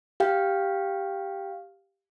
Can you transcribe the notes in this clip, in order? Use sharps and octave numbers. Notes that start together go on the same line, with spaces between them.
G4 F5 G5